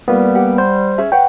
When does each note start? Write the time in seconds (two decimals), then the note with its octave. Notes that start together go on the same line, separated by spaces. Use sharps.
0.08 G3 A#3 B3 F4
0.35 G4 F#5
0.58 C5
0.98 C#4 G#4 E5
1.12 B4 C#5 F#5 G5